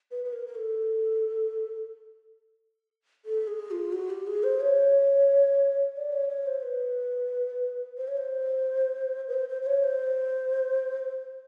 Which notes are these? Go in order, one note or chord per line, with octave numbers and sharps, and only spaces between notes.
B4
B4
A#4
A#4
A4
A4
G#4
F4
F#4
G4
G#4
C5
C#5
D5
C#5
C#5
C5
B4
C5
C#5
C5
B4
C5
C5
C5
C#5
C5